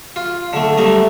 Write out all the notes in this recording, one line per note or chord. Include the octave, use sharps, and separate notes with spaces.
F4
D3 A3
G3 A3 A#5 D#6